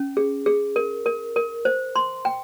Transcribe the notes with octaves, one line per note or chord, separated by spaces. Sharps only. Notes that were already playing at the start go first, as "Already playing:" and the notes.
Already playing: C#4
G#4
G#4
A#4
A#4
A#4
C5
C6
G5